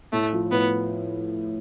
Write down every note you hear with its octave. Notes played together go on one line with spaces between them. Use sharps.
A2 A3
F3
A2 B3